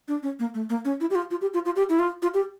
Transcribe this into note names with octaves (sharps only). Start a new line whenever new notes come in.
D4
C#4
A#3
A3
A#3
C#4
E4
G4
F4
F4
G4
F4
F4
G4
E4
F4
F4
G4